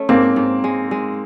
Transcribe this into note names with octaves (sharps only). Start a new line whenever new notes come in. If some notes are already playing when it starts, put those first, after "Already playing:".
Already playing: A3 C#4
G#2 A#3 C4
G#2
G#3
G#3